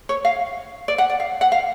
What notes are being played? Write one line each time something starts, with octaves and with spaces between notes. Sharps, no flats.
C#5
F5
D5
F#5
D5
F5
F#5
F5